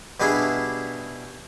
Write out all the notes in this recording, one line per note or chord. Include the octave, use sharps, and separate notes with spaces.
B2 G3 D4 E4 G#4